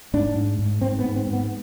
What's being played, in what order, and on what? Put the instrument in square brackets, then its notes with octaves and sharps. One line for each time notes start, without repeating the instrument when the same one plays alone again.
[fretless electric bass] G#2 D4
G#2
G#2
G#2 C4
B3
G#2
C4
G#2
B3